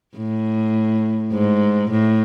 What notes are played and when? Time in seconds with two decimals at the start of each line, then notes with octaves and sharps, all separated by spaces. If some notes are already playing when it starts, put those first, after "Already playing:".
0.17 A2
1.32 G#2
1.91 A2